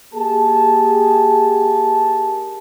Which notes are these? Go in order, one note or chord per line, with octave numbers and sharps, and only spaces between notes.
A#3 G4 G#4 A5